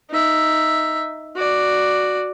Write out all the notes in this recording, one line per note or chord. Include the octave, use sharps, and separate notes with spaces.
D#4 E5
F#4 D5